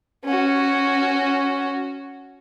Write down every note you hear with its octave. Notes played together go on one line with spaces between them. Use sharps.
C#4 F#4